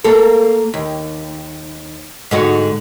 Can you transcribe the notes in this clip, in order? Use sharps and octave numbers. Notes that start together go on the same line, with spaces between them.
A#3 A4
D#2
G#2 D3 F#4